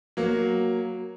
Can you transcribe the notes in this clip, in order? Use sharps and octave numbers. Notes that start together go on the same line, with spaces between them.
F#3 A#3